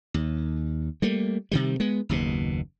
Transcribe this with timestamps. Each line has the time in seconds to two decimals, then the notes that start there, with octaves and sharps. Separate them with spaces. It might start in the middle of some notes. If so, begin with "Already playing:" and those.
0.14 D#2
1.02 G3 A3 A#3
1.51 C3 D#3 G3
1.80 G#3 B3
2.09 F#1 D#2 B2